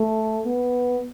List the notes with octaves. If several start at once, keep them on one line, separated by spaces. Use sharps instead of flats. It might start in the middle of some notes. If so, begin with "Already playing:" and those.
Already playing: A3
B3